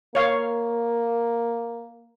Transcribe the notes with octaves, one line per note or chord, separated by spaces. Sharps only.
A#3 C#5 F5